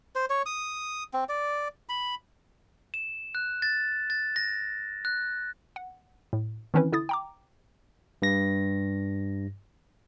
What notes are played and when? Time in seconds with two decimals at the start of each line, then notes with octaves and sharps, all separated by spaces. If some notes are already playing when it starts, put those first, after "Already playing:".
0.15 C5
0.30 C#5
0.46 D#6
1.14 C4
1.29 D5
1.89 B5
2.94 E7
3.35 F#6
3.62 A6
4.10 A6
4.36 A#6
5.05 F#6
5.76 F#5
6.33 A2
6.74 D#3 E3 C4 C#4 E4 B4
6.92 D3 E4 D#6 A6
7.09 G5 A#5 D6
8.22 G2 A#6